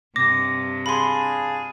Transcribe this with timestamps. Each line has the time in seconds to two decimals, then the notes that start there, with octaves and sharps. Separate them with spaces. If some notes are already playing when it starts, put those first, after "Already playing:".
0.16 G2 C3 D6 A#6
0.86 D4 F4 G#4 B5 C6